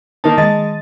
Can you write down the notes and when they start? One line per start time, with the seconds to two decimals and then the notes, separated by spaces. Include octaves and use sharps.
0.24 D#3 A#3 D#4 A5
0.38 D#3 G#3 D#5 A6